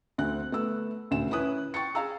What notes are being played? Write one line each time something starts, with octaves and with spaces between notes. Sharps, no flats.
D2 C4 F#6
A3 B3 E6
D#1 D2 C#3 E7
C#4 E4 B4 D#6 F#6
G5 C#6 A6 C#7
G#4 F5 A#5 E6